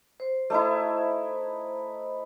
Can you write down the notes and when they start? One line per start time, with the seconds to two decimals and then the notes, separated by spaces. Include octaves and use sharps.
0.20 C5
0.50 A3 D#4 E4